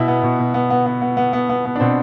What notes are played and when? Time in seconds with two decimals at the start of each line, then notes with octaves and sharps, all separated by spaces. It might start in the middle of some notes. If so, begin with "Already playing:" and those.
Already playing: B2 E4
0.08 B3
0.23 B2
0.39 B2
0.54 B3
0.70 B3
0.86 B3
1.02 B3
1.17 B3
1.33 B3
1.49 B3
1.65 B3
1.76 D4
1.80 B2 C4